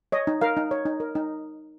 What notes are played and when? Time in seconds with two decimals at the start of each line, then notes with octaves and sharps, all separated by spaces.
0.12 C#5 D#5
0.27 D#4
0.41 A#4 F5
0.57 D#4
0.71 C#5
0.86 D#4
1.00 A#4
1.15 D#4